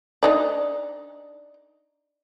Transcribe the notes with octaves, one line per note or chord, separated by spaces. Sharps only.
D4 D#4 D5